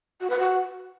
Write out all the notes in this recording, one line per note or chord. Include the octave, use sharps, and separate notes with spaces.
F#4
B4
F#4